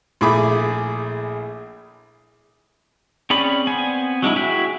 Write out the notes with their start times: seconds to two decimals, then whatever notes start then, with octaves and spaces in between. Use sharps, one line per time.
0.21 A#1 A3 E4 G#4 B5 D6
3.30 C4 C#4 G#4 D5 B5
3.67 B3 C4 G#5
4.22 F#3 G#3 D4 E4
4.36 E4 F#4 G#4 E5 G5